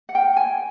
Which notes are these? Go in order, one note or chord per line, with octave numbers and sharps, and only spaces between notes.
F#5
A#4 G5
G#5